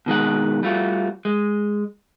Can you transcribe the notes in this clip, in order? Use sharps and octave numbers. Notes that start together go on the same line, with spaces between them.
B2 D#3 G#3 F#5
G3 A3 F4 F#4
G#3